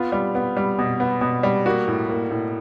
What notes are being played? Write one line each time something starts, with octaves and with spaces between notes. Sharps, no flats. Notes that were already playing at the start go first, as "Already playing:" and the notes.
Already playing: B3 F4
G3
B3
G3
B2
B3
B2
G3
A#3 F#4
A2
A#3
A2